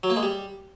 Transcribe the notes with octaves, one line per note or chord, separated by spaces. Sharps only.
F#3
A#3
G#3
G3